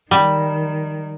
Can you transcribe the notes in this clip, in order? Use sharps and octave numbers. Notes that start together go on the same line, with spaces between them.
D#3 G3